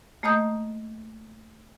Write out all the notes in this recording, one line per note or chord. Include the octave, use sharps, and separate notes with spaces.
A3 A#3 D#5 A#5 D#6 G6